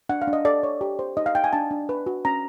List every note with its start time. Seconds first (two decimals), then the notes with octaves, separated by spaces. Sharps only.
0.09 D4 F#5
0.22 F5
0.27 D4
0.33 D#5
0.45 A4 D5
0.63 C#5
0.81 G4
0.99 C5
1.17 D#4 D#5
1.26 F5
1.35 D#4 G5
1.44 G#5
1.53 D4 A5
1.71 D4
1.89 B4
2.06 F#4
2.25 C#4 A#5